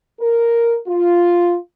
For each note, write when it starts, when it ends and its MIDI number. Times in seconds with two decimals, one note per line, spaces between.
0.20 0.76 70
0.86 1.56 65